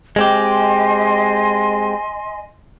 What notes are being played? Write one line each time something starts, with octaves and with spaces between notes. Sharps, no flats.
G#3 C4 G4 D#5 G#5 C6